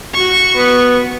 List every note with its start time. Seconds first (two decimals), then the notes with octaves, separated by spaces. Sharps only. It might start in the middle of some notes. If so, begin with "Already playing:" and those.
0.15 F#4 C#6
0.56 B3